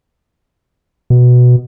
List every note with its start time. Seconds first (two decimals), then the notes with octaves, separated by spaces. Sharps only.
1.10 B2